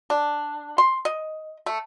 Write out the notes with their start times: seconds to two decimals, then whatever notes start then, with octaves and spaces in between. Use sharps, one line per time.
0.10 D4
0.78 C6
1.05 D#5
1.66 A3